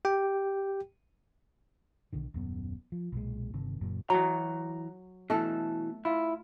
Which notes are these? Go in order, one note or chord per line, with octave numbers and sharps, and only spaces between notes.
G4 G5
B1 D3 D#3
D#1 F#2 B3
F3
B1 A#2 G#3
G1 C3 D#3
F#1 F#2 A#2 F#3
E3 F#3 A#5
B2 E3 A3 A4
E4 F4